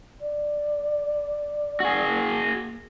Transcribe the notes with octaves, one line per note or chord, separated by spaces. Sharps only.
D5
F#4 G#4
A#3